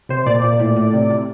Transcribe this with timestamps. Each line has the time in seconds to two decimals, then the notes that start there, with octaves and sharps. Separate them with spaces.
0.09 C3 C5
0.26 A#2 D5
0.44 A#2
0.59 A2
0.76 A2
0.93 C3
1.10 C3